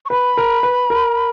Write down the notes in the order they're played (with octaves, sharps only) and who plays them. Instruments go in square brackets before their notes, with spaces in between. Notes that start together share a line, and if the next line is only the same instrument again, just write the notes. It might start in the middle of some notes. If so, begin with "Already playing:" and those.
[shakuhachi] C#6
[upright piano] B4 [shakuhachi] B5
[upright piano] A#4
B4
A#4